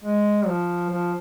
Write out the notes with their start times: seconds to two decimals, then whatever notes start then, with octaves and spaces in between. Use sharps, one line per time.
0.04 G#3
0.47 F3
0.89 F3